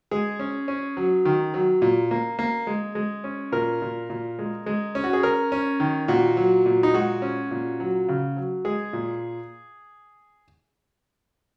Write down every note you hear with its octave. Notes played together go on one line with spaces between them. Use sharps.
G#3 G#4
C#4
C#4
F#3
D#3
F#3
A#2
A#3
A#3
G#3
G#3
C#4
A#2 A#4
A#2
A#2
G#3
G#3
C#4
F#4
G#4
C#4 A#4
C#4
D#3
A#2 F#4
F#3
A#2
D#4
G#3 F#4
C#4
A#2
F#3
C#3
F#3
G#3 G#4
A#2